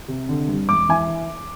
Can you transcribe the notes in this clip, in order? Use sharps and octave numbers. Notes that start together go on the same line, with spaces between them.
C3
D3
G2
E1 D6
E3 G#5